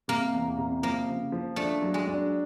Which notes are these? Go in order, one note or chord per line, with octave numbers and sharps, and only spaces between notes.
C3 A#3
E2
C3
F3 A#3
C#3
F3
A3 D4
F#3
G#3
D4